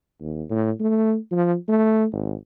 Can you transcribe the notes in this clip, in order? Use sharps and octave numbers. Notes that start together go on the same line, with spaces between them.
D#2
A2
A3
F3
A3
G#1